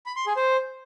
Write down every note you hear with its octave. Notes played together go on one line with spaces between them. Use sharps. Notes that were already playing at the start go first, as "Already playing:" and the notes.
B5
C6
G#4
C5